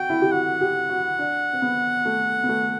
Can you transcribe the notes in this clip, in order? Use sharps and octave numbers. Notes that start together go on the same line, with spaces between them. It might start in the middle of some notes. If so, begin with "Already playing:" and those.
Already playing: F#4 G5
E4
G4
F#4 F#5
G4
F#4
D4
C4
B3
A3
B3
A3